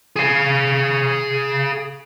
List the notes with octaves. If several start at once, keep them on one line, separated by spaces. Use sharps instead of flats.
G#4 F5